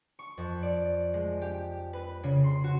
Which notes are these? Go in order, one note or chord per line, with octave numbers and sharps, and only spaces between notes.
C#6
F2
D5
G#3
G4
B4
C#3
C6
F#4